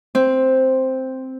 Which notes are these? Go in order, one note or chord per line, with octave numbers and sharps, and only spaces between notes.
C4